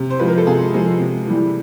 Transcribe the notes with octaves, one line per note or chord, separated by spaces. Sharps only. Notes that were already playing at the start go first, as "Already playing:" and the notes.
Already playing: C3
C5
F3 G#3 B4
A#4
A4
C3 G#4
F3 G#3
C3
E3 G3